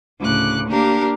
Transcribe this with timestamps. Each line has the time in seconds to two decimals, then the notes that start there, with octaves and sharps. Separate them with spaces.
0.19 D2 A2 C#3 D6 F#6
0.68 A#3 D4 G4 A#4 F5